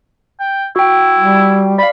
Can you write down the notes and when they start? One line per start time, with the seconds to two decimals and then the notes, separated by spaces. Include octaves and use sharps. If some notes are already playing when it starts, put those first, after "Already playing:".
0.40 G5
0.76 E4 F#4 G5
1.19 G3
1.78 D5 F5 B5